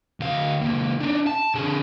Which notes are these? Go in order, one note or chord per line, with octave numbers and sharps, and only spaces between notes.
D2 F5
C#2 A#3
D4 D#4
A5
D3 G#4